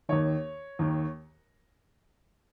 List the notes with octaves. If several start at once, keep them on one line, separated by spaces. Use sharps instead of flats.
D#2 D#3 C#5
D#2 D#3